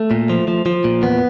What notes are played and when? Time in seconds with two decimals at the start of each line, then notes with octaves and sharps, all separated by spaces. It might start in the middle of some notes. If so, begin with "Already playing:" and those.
Already playing: A3
0.11 A#2
0.30 F3
0.48 F3
0.66 F3
0.84 A#2
1.02 E2 B3